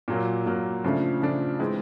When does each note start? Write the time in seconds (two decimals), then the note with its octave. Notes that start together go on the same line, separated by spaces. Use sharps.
0.08 A#2 F#3 A#3
0.46 A#2 F#3 A#3
0.84 C#3 F3 A3 D4
1.22 C#3 F3 A3 D4
1.59 E3 G#3 C4